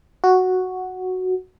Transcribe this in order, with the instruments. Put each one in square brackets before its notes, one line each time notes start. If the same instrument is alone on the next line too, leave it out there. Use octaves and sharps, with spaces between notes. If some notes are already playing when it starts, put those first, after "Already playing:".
[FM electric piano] F#4